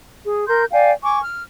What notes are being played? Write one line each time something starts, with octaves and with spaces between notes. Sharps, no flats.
G#4
A#4 C6 G6
D5 F5 G5 G#5
G#5 C#6 D6
F6